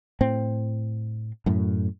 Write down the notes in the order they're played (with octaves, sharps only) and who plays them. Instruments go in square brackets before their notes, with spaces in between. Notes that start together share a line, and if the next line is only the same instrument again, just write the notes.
[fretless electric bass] A2 C4
F#2 A2